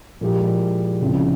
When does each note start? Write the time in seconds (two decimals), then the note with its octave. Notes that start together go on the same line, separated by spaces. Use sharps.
0.21 A#2 F3 G#3 E4 G4
1.01 C#2 C#3 F3 C4 E4